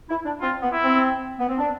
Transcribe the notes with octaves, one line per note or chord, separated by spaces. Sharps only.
E4
D4
C4 F4
B3
E4
C4
B3
C4
D4